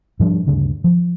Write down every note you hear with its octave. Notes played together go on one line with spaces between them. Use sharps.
G#2 F3 G3 D4
D2 G2 C#3
F3